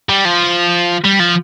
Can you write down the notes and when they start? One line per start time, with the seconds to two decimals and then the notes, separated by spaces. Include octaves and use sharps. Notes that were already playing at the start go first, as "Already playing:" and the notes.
0.09 G3
0.25 F3
1.04 G3
1.20 F3